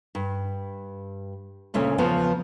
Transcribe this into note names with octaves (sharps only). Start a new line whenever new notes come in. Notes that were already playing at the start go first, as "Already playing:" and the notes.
G2
D2 A#2 C#3 A3 C#4
E2 C#3 F3 B3